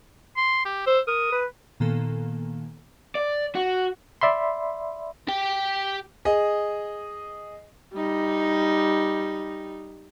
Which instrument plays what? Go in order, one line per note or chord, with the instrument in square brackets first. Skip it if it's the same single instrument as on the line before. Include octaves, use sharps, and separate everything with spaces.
[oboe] C6
G4
[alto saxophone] C5 [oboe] E6
[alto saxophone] A#4 [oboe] D#6
[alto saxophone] B4
[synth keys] A#2 D#3 A#3 B3 A4
[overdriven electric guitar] D5
F#4
[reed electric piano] D5 E5 B5 C6
[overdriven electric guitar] G4 G5
[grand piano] G#4 D#5
[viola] G3 D#4